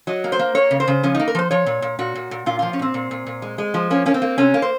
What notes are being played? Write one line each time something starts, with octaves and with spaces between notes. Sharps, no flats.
F#3 D#5
A#3
C5
A#3
A#3 C#5
C#3
C5
C#3
F3 C#4
A#3 D#4
A#4
F3 C5
F3 C#5
A#2
A#2
A#2 F#4
A#2
A#2
A#2 F4
F3 F4
C#4
A#2 C4
A#2
A#2
A#2
G#3
G#3
F3
A#3 C#4
A#3 C#4
C4
A#3
C3 C#4
A#3
C5